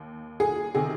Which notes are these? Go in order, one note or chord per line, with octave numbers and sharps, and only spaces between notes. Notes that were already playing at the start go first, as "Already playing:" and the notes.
Already playing: D#2
G#4
C3 D#3 G#4